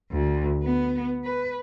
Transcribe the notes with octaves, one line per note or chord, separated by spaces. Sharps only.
D2
B3
B4